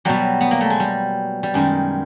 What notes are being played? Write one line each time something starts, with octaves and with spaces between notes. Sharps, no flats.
B2 F#3 G3
B3
A#3
A3
G#3
G3
G3
F#2 D#3 G3 G#3